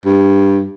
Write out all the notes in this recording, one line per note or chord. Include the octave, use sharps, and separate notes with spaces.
G2